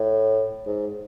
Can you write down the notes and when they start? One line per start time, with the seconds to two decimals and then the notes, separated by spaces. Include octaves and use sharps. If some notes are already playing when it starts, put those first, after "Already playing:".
Already playing: A2
0.67 G#2